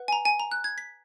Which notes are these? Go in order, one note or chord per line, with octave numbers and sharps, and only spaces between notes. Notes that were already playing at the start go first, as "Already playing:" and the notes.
Already playing: B4 F#5
G#5
A#5
G#5
A#5
F#6
G#6
B6